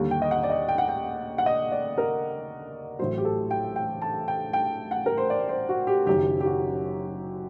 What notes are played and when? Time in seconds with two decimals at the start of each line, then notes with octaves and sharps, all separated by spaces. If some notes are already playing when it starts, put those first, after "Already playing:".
Already playing: D#2 D3 G3
0.11 G5
0.22 D#5
0.31 F#5
0.43 D5
0.50 D#5
0.68 G5
0.78 F#5
0.88 G5
1.38 F#5
1.46 D#5
1.72 D5
1.98 A#4
2.99 A1 A2 F#3 C5
3.18 G4
3.25 A4
3.51 G5
3.76 G5
4.02 A5
4.28 G5
4.53 G5
4.91 F#5
5.06 A#4
5.17 C5
5.30 D5
5.49 C5
5.69 F#4
5.87 G4
6.07 F#1 F#2 D#3 G4
6.40 G4
6.46 F#4